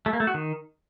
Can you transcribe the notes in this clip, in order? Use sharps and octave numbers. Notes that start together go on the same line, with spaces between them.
A3
A#3
A3
F#4
D#3